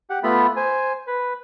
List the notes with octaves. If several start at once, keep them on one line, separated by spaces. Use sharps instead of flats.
G4 F#5
A3 B3 F4 B5
C5 G#5
B4